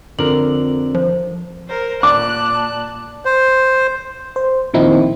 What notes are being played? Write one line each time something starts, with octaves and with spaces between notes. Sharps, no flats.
F2 D3 A#4 F#7
F3 C5
A#4 C5
A#2 D5 A5 D6 F#6
C5
C5
A#2 D#3 F3 C4 D#4 E4